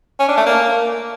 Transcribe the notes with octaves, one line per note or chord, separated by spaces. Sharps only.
C#4
D4
A3
A#3